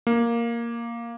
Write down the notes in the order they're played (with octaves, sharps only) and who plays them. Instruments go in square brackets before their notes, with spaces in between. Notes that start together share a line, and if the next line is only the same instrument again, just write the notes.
[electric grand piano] A#3